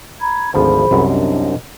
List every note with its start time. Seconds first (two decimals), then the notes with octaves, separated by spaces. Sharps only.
0.20 A#5 B5 G#6
0.54 G#1 D2 F3 G#4 C5 B5
0.91 C2 F#2
1.09 D4 D#5